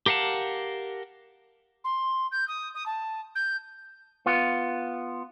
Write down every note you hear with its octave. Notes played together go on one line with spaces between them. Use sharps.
G4 A#4 F5 F#5 A5
C6
G6
D#6
D#6
A5
G6
B3 F4